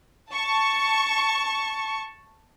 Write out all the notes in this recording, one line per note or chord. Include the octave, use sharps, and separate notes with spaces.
A5 C#6